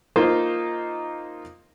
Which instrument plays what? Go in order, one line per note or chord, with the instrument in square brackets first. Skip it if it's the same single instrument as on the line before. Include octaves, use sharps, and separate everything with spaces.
[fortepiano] A#3 D#4 F4 C5